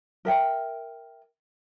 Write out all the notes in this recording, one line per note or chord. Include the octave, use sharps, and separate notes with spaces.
A#4 E5 G5